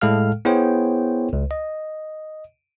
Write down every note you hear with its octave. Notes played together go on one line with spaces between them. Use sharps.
A2 G#3 A4 F5 F6
B3 E4 G#4 C5 C#5 G5
C#2
D#5